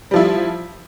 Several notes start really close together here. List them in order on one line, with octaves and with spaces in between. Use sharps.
G3 F3 E4